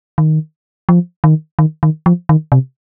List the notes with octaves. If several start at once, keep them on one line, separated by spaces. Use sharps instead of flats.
D#3
F3
D#3
D#3
D#3
F3
D#3
C3